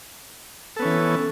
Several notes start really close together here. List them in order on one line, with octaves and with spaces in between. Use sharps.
A4 B3 C#4 E3